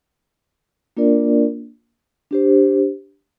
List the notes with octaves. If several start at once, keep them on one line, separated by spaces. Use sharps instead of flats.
A#3 D4 F4 A#4 D5
D4 G4 C5